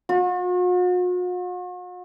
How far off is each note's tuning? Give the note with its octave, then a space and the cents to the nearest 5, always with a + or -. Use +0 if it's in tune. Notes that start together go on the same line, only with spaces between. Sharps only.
F#4 -45